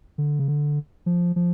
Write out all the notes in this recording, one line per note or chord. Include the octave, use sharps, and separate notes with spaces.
D3
C#3
D3
F3
F3